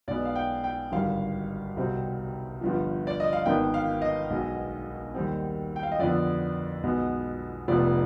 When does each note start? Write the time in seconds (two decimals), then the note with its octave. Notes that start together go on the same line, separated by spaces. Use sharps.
0.08 B1 B2 G#3 B3 D5
0.25 F5
0.36 G5
0.64 G5
0.92 G#1 G2 D3 G3 F5
1.77 C2 B2 G3 C4
2.61 G1 G2 F3
3.07 D5
3.20 D#5
3.33 F5
3.46 G#1 G#2 D#3 B3 G5
3.74 F5
4.02 D#5
4.30 B1 B2 G#3
5.15 D#2 D#3 G3 C4
5.76 G5
5.83 F5
5.92 D#5
5.99 F2 D3 F3 B3 D5
6.83 B1 B2 G#3 B3
7.68 F1 F2 C3 F3 B3 D5